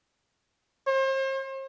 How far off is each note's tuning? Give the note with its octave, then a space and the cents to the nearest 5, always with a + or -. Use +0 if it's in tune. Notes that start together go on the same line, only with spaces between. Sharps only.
C5 +40